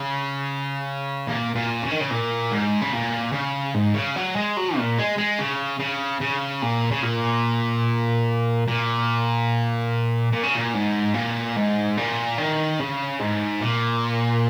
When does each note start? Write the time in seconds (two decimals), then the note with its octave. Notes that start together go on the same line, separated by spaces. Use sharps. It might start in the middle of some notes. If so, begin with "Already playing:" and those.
Already playing: C#3
1.27 A#2
1.55 A#2
1.83 C#3
1.91 D#3
2.00 C#3
2.10 A#2
2.51 G#2
2.81 C#3
2.93 A#2
3.33 C#3
3.75 G#2
3.94 C#3
4.16 F#3
4.36 G#3
4.57 F#3
4.77 A#2
4.98 G#3
5.18 G#3
5.39 C#3
5.79 C#3
6.21 C#3
6.62 A#2
6.91 C#3
7.03 A#2
8.68 A#2
10.33 A#2
10.43 C#3
10.55 A#2
10.74 G#2
11.14 A#2
11.56 G#2
11.97 A#2
12.38 D#3
12.80 C#3
13.20 G#2
13.62 A#2